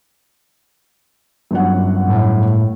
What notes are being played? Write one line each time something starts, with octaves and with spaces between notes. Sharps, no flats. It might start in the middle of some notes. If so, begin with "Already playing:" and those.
G1 F#2 F#5
A2